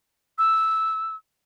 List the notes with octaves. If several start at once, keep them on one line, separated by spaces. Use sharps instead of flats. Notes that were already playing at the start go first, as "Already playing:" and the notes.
E6